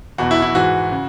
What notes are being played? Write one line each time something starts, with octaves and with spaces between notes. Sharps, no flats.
E2 B2 F#4
E4
E4
G#2 E3 F#4
C#3